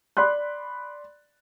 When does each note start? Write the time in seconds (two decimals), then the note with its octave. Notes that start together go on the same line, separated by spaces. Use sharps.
0.17 D5 B5 C6 F#6